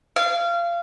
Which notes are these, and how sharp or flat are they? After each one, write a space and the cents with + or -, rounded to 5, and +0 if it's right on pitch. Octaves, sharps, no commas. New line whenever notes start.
F5 -25